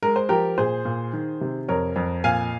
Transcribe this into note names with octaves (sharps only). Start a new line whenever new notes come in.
G#3 A#4
C5
F3 G4 A#4
A#2 G#4 C5
A#2
D#3
C3
F2 A#4 C#5
F2
A#2 F5 G#5